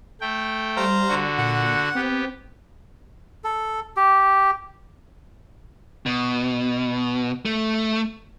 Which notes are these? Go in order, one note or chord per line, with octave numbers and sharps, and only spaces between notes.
A3 G5
G3 C5 F5 A#5
D3 F#4
A#2 F#5
B3 C4 G4
A4
G4
B2
A3